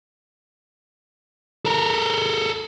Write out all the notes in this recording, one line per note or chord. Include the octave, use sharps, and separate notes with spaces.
A4 A#4